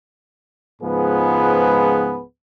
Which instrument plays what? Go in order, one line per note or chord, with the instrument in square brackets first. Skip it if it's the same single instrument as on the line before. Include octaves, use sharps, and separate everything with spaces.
[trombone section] C#2 G#2 F3 B3 G#4 B4